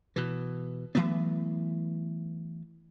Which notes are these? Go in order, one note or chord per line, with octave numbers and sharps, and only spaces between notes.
B2 E3
E3 F#3 A3 B3